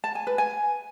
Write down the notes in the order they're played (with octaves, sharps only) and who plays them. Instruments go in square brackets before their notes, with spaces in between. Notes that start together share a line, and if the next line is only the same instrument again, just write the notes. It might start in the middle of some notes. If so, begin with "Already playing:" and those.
[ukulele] A5
G#5
B4
G#5